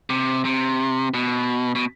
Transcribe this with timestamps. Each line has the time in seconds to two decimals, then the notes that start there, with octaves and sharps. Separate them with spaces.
0.10 C3
0.45 C3
1.14 B2
1.75 B2